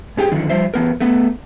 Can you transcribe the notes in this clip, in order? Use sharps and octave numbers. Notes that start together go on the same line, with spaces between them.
G#2 G4 G#4 G5
F#2 D3 D#3 F3
F3 G3 C5 E5
E3 B3 A#4
A3 B3